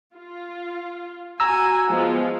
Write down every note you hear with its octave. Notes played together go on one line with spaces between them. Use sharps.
F4
F#4 G#5 A#5 E6
F3 G#3 B3